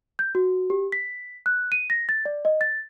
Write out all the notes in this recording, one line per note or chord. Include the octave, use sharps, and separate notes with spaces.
G6
F#4
G4
B6
F#6
D#7
A#6
A6
D5
D#5
A6